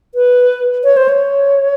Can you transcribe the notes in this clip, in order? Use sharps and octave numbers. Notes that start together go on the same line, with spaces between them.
B4
C#5
C5
C#5